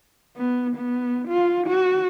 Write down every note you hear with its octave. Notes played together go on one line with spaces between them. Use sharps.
B3
B3
F4
F#4